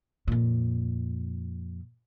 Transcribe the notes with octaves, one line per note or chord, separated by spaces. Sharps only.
F2 A#2